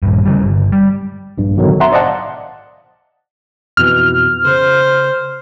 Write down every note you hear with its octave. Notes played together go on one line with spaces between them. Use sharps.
A#1 G2
C#3 E3 G3
G1
G3
A#1 G2
A#1 G#2 B2 D3 D#3 F#3
E5 F#5 A#5 C6
C5 D5 D#5 F5 F#5 A5
F2 B2 E3 F6
C#3 C5